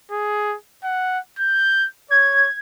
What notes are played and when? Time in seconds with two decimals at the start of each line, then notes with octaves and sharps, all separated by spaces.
0.11 G#4
0.84 F#5
1.39 G6
2.11 C#5 G#6